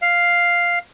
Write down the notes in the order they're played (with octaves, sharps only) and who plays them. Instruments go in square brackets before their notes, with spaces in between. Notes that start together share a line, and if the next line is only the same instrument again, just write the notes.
[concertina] F5